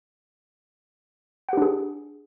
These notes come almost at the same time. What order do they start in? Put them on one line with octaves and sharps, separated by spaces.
F#5 G4 D4 G#4